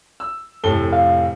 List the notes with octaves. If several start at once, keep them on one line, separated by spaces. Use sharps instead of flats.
E6
F1 A2 A4 G7
F5